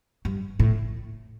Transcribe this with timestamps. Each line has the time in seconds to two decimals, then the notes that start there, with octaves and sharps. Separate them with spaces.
0.25 G2
0.60 A2